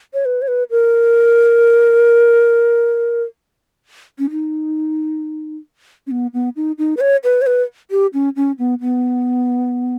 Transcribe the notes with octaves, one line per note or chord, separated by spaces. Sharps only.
C#5
B4
C#5
B4
A#4
C#4
D#4
C#4
B3
B3
D#4
D#4
B4
C#5
B4
C#5
B4
G4
C#4
C#4
B3
B3